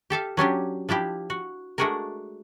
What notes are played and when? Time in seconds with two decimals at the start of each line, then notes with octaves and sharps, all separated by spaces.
0.10 G4 A4 E5 F5
0.37 F#3 C#4 D4 G4
0.89 F3 D4 E4 G4
1.30 F#4
1.78 G#3 A3 D4 F#4 G#4 A#4